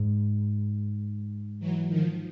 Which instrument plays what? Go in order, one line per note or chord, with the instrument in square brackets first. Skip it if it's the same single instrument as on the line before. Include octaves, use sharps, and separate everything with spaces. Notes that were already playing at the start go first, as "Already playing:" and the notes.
Already playing: [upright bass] G#2
[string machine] E3 F#3
D#3 F3